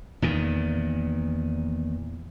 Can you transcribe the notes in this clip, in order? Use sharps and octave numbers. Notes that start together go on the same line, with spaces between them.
E2 A#2 D#3